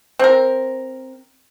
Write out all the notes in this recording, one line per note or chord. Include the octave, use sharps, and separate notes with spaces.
C4 A#4